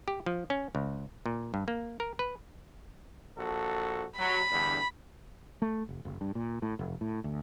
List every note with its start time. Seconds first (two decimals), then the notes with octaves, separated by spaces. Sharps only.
0.08 G4
0.26 F3
0.50 C#4
0.75 C#2
1.26 A#2
1.54 G2
1.68 A#3
2.00 A#4
2.19 B4
3.38 A#1 F#4 A4
4.19 F#3 B5
4.52 E2 G2 D3
5.62 A3
5.89 F1
6.05 F#1
6.21 G2
6.35 A#2
6.62 A2
6.79 F1
7.01 A2
7.24 D2